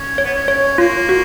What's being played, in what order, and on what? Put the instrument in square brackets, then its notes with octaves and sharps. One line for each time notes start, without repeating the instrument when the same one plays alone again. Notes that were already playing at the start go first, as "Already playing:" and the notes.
Already playing: [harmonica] C#4
[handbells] C#5
[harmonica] B3
C#4
[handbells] C#5
[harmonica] A#3 [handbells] F4
[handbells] F#4